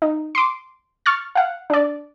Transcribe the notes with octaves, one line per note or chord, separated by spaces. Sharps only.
D#4
C6 D6
C#6 F6 A6
F5 F#5
D4 D5